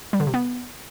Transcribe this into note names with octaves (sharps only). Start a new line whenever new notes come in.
G3
D3
C3
B3